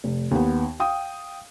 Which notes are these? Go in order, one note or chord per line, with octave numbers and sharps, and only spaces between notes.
F1
D#2 B3
F5 G5 D#6